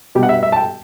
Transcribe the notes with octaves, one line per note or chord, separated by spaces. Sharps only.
B2 G3 G4
F#5
E5
E5
A5
G5